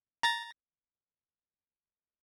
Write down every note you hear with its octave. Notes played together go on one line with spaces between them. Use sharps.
A#5 A6 A#6